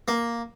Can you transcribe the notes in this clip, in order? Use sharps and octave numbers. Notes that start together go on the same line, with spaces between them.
A#3